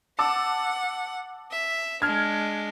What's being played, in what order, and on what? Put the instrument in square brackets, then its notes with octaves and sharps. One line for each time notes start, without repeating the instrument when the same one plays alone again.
[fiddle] F#5 [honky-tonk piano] A5 D6 E6
[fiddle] E5
[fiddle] G#3 D4 [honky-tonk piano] F6 G#6